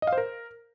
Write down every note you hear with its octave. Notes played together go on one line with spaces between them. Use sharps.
D#5
F5
C5
A#4